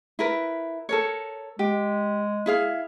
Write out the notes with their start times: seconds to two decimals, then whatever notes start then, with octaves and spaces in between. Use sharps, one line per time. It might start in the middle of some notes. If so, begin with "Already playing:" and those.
0.19 E4 A#4 B4
0.89 A4 A#4 C#5
1.59 G#3 G4
2.46 E4 G#4 F5